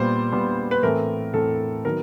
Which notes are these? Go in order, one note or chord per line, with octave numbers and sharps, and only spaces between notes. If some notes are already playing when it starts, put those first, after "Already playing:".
Already playing: A#2 G3 B3 C5
A#2 G3 B3
B4
A2 E3 A3 C4 A#4
A2 E3 A3 C4 A4
D#3 F#3 B3 A#4